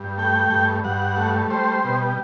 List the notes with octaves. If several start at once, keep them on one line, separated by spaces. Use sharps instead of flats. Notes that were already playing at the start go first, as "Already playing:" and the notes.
Already playing: G2
A3 G5
G2
G2 F#5
A3
G3 C5
B2